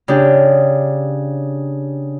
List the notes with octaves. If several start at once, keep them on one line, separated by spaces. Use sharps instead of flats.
C#3 D4 G4